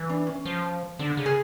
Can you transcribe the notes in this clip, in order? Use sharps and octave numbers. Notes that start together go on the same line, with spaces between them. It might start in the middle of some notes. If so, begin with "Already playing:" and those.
Already playing: E3
D4
C#4
F3
D3 D4
C#3
G#4